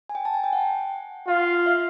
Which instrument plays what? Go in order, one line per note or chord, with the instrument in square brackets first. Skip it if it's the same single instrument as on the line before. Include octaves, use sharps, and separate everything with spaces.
[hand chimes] G#5
G5
A5
G#5
G5
F#5
[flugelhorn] F4 [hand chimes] F5
[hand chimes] E5